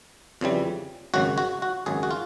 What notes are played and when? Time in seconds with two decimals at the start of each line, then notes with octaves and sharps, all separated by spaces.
0.41 F2 C#3 E3 G3
1.14 G#1 F#2 C#3 F#4
1.38 F#4
1.62 F#4
1.86 G#1 F#2 C#3 G#4
2.03 F#4
2.11 F4